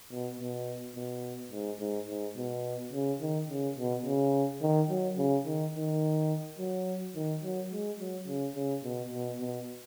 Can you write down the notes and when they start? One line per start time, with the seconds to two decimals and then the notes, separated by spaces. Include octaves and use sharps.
0.11 B2
0.40 B2
0.95 B2
1.52 G#2
1.80 G#2
2.08 G#2
2.37 B2
2.93 C#3
3.21 D#3
3.49 C#3
3.77 B2
4.05 C#3
4.62 D#3
4.90 F#3
5.18 C#3
5.46 D#3
5.74 D#3
6.58 F#3
7.15 D#3
7.43 F#3
7.72 G#3
8.00 F#3
8.27 C#3
8.55 C#3
8.84 B2
9.13 B2
9.40 B2